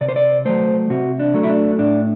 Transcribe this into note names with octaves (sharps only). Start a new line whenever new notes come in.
C3 D5
C5
D5
F#3 A3 C5
C3 F#4
D4
F#3 A3
E4
D4
A2 D4